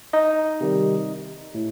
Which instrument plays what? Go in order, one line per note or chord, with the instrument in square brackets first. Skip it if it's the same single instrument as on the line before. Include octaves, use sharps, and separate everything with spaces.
[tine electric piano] D#4 D#5
C3 D#3 G3
A2